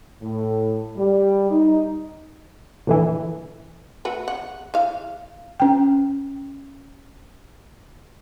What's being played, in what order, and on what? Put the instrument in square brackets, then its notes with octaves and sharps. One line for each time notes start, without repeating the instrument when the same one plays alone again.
[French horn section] A2
G3
D#4
[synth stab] A#2 D3 E3
[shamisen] A3 F#4 B4
F#5
E3 F5
[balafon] C#4 G5